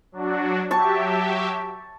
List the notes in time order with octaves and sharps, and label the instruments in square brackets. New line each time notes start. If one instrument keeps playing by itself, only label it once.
[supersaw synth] F#3 D4 F#4
[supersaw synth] F#3 G4 E5 [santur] A5 C#6